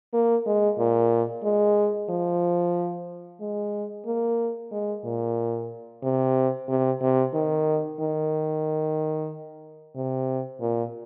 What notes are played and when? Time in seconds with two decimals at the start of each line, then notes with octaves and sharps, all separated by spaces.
0.13 A#3
0.46 G#3
0.78 A#2
1.44 G#3
2.09 F3
3.40 G#3
4.06 A#3
4.71 G#3
5.04 A#2
6.03 C3
6.68 C3
7.01 C3
7.34 D#3
8.00 D#3
9.95 C3
10.61 A#2